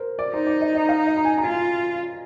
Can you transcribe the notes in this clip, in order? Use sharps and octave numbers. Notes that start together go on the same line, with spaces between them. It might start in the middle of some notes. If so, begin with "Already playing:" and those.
Already playing: A#4 C5
D5
D#4 C5
D5
D#5
D#5
F5
D#5
A#5
G#5
A#5
F4 G#5